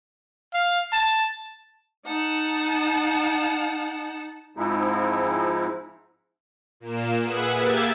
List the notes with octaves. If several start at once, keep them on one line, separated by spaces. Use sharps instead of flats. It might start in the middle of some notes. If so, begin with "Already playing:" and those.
F5
A5
D#4 F#5 A5
G#2 F3 G#3 C4 D#4 E4
A#2 A#3 E7
G#4 B4 E5 F#5
A#3 G4 E5 G#6 A6